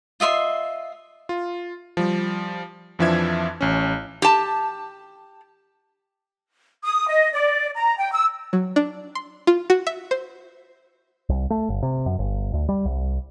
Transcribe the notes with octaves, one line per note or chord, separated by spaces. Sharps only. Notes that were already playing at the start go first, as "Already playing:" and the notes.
F4 D#5 E5 C6
F4
F3 G3
F2 E3 F3 D4 E5 G#6
A1 C#4
G4 A5
D#6
D#5
D5
A#5
G5
E6
F#3
D4
C6
F4
F#4
E5
C5
C2
A3
G1
C3
F#2
G1
D2
G3
C2